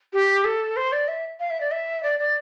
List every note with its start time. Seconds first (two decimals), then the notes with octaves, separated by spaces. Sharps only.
0.13 G4
0.44 A4
0.76 C5
0.92 D5
1.08 E5
1.40 F5
1.50 E5
1.60 D5
1.71 E5
2.03 D5
2.19 D5